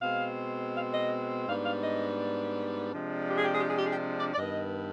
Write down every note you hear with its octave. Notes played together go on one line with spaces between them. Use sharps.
B2 G#3 C4 F5
F5
D#5
G#2 G3 B3 D4 F5
F5
D#5
C3 F3 G#3 D4
G4
G#4
G4
G#4
G4
G#4
G4
G#4
G4
D5
D5
G2 D#3 B3 D#5